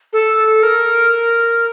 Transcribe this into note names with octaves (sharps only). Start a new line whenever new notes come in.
A4
A#4